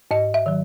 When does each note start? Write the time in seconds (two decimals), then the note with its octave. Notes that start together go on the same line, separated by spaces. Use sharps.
0.11 G#2 D#5
0.34 E5
0.46 D#3 F#3